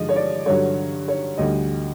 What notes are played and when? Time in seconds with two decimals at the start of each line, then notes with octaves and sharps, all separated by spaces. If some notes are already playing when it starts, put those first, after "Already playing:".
Already playing: G2 D3 F3 G#3 D#5
0.09 C#5
0.16 D5
0.46 G2 D3 F#3 C#5
1.08 C#5
1.38 D2 D3 G3 D#5